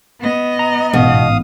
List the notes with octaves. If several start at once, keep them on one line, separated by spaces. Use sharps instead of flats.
B3 D#5
A#5
A1 G#2 B2 F5 D#6